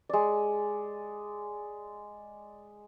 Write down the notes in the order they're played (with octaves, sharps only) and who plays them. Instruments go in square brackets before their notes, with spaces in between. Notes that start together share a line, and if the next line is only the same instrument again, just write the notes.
[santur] G#3 D5